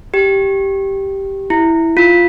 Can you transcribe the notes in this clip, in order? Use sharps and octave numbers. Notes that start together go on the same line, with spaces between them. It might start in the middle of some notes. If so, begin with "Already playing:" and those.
G4
E4
F4